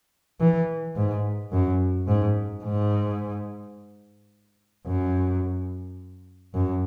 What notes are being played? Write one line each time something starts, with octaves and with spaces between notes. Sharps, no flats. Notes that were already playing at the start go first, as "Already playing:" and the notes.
E3
G#2
F#2
G#2
G#2
F#2
F#2